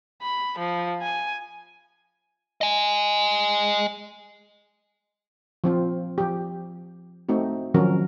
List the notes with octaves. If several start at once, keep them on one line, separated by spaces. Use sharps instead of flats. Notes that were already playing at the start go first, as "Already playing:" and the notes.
B5
F3
G#5
D#5 G#5
F3 C4 F4
F3 G4
A3 C4 D#4 F#4
D#3 F3 F#3 C#4 F#4 A#4